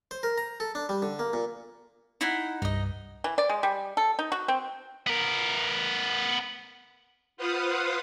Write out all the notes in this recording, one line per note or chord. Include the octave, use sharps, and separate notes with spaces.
C5
A#4
A#5
A4
D4
G3
D3
A#3
A#2
D#4 E4 F#5
C2 G2 D#4 D#5
E3
D5
G#3
G3
A4
D#4
F#4
C4
B3 A#4
F4 B4 C5 F5 F#5 D#6